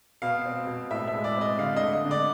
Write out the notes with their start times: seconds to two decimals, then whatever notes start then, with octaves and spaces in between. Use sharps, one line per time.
0.22 B2 F5
0.45 C4
0.67 B2
0.91 A2 E5
1.08 E5
1.14 G#3
1.24 D5
1.36 C4 D#5
1.59 D3 F5
1.76 D#5
1.82 A3
1.93 D#5
2.05 D3
2.11 D5